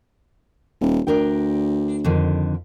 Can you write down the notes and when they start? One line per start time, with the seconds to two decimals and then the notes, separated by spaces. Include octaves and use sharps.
0.81 D#1
1.07 D2 D4 A#4 G5
2.04 F2 D3 D#3